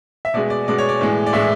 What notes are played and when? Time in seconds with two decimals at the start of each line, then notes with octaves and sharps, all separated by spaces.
0.25 E5
0.34 B2 G#3 D5
0.50 D5
0.68 B2 G#3 D5
0.78 C#5
0.89 D5
1.01 A2 E3 G#3
1.26 D5
1.33 A2 E3 G#3 E5